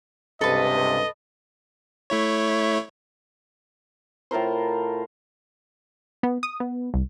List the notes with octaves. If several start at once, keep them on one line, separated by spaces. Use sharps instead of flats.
C#2 G2 C3 A4 B4 D#5
A3 E4 C#5
A2 F4 A#4 C5
B3
D#6
B3
C2